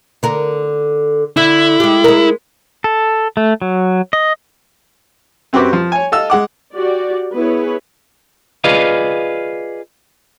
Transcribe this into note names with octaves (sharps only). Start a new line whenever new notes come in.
D3 A#4
D3 E4
G#3 G4
G#3 A#4
A4
A3
F#3
D#5
F#2 C4 F#4 G4 B4 D6
F3
C#5 G#5
A4 D#5 F5 E6
G#3 F#5 D6
F#4 G4 D5
B3 E4 G#4 B4 C#5
F4 G#4 B4 D5 D#5 F5